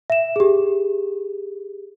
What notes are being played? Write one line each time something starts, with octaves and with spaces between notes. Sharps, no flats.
E5 E7
G4 G#4